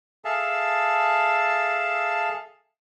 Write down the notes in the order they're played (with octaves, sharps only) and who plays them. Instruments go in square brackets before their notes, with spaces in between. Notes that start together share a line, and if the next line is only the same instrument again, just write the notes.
[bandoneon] G#4 A4 E5 F5 A5